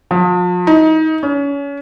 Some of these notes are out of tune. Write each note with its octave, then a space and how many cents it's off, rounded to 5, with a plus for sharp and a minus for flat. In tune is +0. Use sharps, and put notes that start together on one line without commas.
F3 +40
D#4 +25
C#4 +30